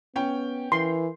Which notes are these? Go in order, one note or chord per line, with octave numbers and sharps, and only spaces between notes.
B3 C#4 G5
E3 A#4 C6